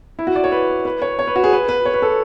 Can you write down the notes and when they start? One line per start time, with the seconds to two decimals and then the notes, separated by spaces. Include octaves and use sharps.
0.19 E4
0.27 F#4
0.36 D5
0.44 C#5
0.52 B4
0.85 B4
1.02 C#5
1.19 C#5
1.27 B4
1.36 F#4
1.44 G#4
1.53 B4
1.69 B4
1.85 C#5
1.94 B4
2.02 A4